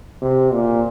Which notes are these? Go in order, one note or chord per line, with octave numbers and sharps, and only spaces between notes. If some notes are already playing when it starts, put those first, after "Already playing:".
C3
A#2